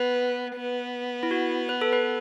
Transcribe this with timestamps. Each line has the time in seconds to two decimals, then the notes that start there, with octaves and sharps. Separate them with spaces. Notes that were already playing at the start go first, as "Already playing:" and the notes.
Already playing: B3 B4
0.55 B3
1.23 E4
1.31 F#4
1.69 B4
1.81 A4
1.93 B4